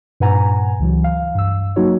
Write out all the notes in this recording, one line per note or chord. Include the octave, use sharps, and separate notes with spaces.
G2 A#2 B4 F#5 G#5 A#5
C#2 E3 F#3
F5
G2 E6
F#3 A#3 D#4 F#4 C#5